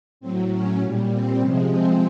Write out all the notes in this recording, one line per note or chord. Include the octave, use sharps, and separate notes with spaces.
A2 F#3 C4
C#4
A#2 G3
C4
C3 F3 G#3 C#4
C4